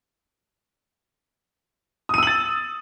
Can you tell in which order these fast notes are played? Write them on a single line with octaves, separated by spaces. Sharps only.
D#6 D#7 E6 F#7 A6